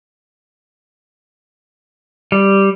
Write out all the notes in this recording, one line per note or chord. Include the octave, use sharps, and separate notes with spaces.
G3